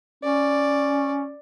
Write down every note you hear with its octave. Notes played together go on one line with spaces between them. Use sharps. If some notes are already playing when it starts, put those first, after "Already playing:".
C#4 D5